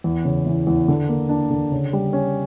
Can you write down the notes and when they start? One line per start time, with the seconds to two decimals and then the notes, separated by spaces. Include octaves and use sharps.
0.04 E2
0.25 C#3
0.46 E3
0.67 E2
0.88 D3
1.09 A#3
1.29 D4
1.51 D3
1.72 C#3
1.93 G3
2.13 C#4